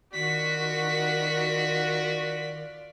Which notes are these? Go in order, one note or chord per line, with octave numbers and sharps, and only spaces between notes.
D#3 F4 F#4 D5 B6